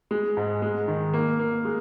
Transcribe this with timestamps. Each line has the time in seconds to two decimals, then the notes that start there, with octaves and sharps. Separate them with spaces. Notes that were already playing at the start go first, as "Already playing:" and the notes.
0.11 G#3
0.37 G#2
0.62 G#3
0.88 D#3
1.13 A#3
1.39 A#3
1.65 G#3